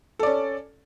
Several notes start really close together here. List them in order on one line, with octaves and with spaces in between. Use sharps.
A4 D5 C#4